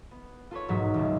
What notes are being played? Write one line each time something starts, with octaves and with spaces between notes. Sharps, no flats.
B3
F4 A4 B4 C#5
E1 B1 G#2 F#3 F#4 B6
D#1 C#2